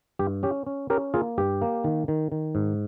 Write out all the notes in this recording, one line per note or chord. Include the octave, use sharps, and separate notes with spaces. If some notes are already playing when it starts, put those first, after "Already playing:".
G2 G4
C#4 G4
C#4
C#4 G4 A#4
A#3 F4 G#4
G2 G4
A#3
D#3
D#3
D#3
G#2